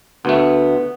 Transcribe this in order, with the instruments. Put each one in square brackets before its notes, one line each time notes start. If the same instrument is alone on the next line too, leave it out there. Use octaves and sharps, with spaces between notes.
[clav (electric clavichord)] D2 A3 [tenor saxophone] B3